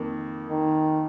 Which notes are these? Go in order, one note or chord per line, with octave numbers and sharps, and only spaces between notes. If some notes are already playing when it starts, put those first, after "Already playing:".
Already playing: F2 D#3 A#3
D#3